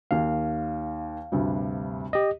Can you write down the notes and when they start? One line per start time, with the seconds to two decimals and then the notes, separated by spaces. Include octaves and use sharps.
0.11 D#2 A#3 F5
1.32 D2 G2 C3
2.13 G4 D#5